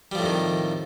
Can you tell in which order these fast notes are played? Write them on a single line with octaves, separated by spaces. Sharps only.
G3 F3 A2 F2 D#3